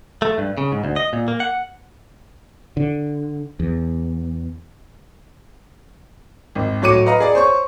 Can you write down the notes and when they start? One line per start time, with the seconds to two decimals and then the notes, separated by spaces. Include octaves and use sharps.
0.22 A3
0.38 G2
0.58 C#3
0.72 G#2
0.84 D2
0.96 D#5
1.13 A#2
1.28 A#3
1.40 F#5
2.77 D3
3.60 E2
6.55 G#1
6.82 A2 F#3 C#5 D6 C#7 D#7
7.06 B4 D#5 F5 A#5
7.20 G#4 D5
7.35 C5 C#5 C#6